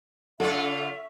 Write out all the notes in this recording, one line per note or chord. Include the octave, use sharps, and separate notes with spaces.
C#3 F4 A4 E5 C#6